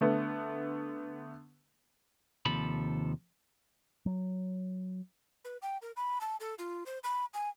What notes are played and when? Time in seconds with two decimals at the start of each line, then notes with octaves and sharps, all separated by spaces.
0.01 D3 A3 B3
2.46 D#2 C3 F3 A4 B5
4.06 F#3
5.45 B4
5.62 G5
5.82 A#4
5.97 B5
6.21 A5
6.40 A4
6.59 F4
6.86 C5
7.04 B5
7.34 G#5